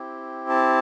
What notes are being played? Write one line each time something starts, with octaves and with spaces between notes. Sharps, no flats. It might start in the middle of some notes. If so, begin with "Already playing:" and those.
Already playing: C4 E4 G4
A5